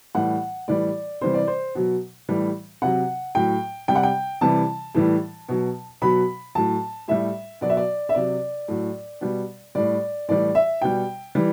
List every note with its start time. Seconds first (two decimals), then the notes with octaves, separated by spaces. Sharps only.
0.15 A2 E3 G3 F#5
0.68 A2 E3 G3 D5
1.21 C3 E3 G3 C5
1.34 D5
1.47 C5
1.75 B2 F#3
2.29 A2 E3 G3
2.82 C3 F#3 F#5
3.35 A2 F#3 G5
3.88 C3 G3 G5
3.95 F#5
4.03 G5
4.41 C3 E3 G3 A5
4.95 A2 E3 G3
5.49 B2 F#3
6.02 B2 F#3 B5
6.55 A2 F#3 A5
7.08 A2 G3 E5
7.61 B2 F#3 D5
7.69 E5
7.77 D5
8.09 E5
8.15 C3 F#3 D5
8.68 A2 F#3
9.21 B2 G3
9.75 A2 G3 D5
10.28 A2 E3 G3 D5
10.55 E5
10.81 B2 G3 G5
11.35 E3 G3